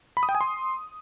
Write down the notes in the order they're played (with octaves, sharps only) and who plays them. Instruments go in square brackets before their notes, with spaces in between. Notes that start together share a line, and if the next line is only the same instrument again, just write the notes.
[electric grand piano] B5
D#6
G5
G#5
C6